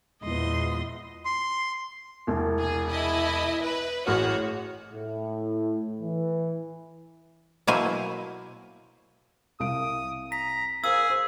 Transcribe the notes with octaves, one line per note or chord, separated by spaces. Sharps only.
E2 A#2 F3 G#3 B3 E4 D#5 C6
C6
E1 C2
G#4
E4 D#5
B4
A1 F#4 G#4 C#5 F6
A2
E3
B2 F#3 A#3 E4 C5 G#5
C2 F5 D#6 D7
A#5 B6
G#4 A#4 C5 F5 E6
C5